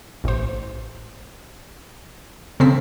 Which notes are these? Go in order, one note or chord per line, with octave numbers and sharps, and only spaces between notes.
A1 C5
C#3 C4 A4 B6